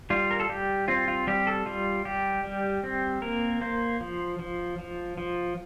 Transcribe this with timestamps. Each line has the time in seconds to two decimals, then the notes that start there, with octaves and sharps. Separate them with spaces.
0.10 G3 F4
0.31 A#4
0.40 A4
0.49 G3 G4
0.88 C4 F4
1.08 F4
1.27 G3 G4
1.47 A4
1.66 G3 F4
2.05 G3 G4
2.44 G3
2.84 C4
3.22 A#3 A#4
3.61 A#3 C5
4.01 F3
4.39 F3
4.78 F3
5.17 F3